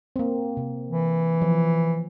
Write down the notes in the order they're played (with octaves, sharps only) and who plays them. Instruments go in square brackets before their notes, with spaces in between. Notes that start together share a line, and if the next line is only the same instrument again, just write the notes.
[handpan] A#3 C4
C3
[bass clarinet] E3
[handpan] F3